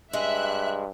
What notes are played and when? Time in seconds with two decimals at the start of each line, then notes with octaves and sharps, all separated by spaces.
0.13 G2 G#3 E5 F#6